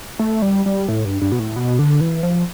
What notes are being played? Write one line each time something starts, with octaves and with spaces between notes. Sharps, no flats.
A3
G3
G3
A2
G2
G2
B2
A2
B2
D3
E3
F3